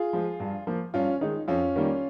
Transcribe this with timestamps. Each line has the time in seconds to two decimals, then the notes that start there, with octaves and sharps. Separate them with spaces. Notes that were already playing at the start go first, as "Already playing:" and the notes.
Already playing: F4 G#4
0.13 F3 G#3
0.40 G2
0.67 F3 A#3
0.94 G2 C#4 F4
1.21 D#3 G#3 D#4
1.48 F2 C#4 F4
1.76 D#3 G3 A#3